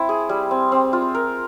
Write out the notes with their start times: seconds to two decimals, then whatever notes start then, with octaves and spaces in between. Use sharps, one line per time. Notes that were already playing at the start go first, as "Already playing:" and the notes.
Already playing: C4 E4
0.09 G#4
0.29 G3
0.51 C4
0.72 C4
0.93 F4
1.15 A#4